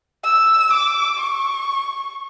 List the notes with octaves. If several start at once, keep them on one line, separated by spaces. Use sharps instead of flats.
E6
D6
C#6